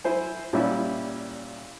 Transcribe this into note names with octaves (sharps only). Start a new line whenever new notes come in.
E4 C5 G#5
A#2 G3 C#4 E4 E5